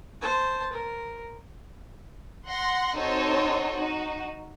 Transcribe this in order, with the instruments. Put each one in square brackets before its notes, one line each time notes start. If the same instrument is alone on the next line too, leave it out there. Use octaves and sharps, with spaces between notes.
[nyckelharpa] C5 A5
A#4
[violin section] F#5 C6 A#6
C4 D#4 F#4 A4 C5 C#5
D#4 F#4